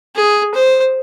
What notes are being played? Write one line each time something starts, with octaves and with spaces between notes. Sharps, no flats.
G#4
C5